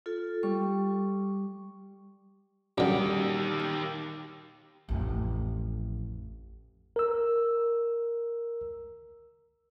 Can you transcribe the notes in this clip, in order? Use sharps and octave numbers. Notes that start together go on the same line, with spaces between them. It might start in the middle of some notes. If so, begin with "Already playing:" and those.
F4 A4
G3 C#6
F#2 A#2 D3 D#3 G3 G4
A1 F2
A#4 E6